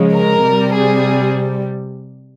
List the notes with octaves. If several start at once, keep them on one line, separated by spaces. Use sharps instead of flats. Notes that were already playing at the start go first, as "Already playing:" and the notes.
Already playing: C#3 F3 G#3
A#4
C3 G3
G#4